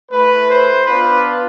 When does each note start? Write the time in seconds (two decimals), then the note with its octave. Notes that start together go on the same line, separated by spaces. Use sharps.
0.11 A3 E4 B4
0.49 C5
0.85 B3 D4 F4 B4